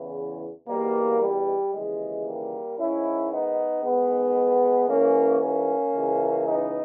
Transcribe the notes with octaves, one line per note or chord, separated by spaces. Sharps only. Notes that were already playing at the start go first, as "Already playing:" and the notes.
Already playing: E2 C#3 E3
E2 B2 G3 A#3
G3
D#2 C#3 E3 G#3
G3 A#3
G#2 D#3 C#4 E4
B3 D#4
G#2 D#3 G#3 B3
G#2 E3 A#3 C#4
A#3 C#4
C#2 C#3 E3
B3 D#4